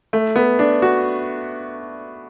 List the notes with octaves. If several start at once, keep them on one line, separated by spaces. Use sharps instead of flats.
A3
B3
D4
F#4